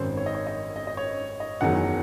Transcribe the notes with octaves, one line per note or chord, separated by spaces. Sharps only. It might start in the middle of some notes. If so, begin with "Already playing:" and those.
Already playing: G#1 F#2 D#3 C5
C#5
D#5
C#5
D#5
D#5
D#5
C#5
D#5
F#1 E2 D#3 F#3 F#5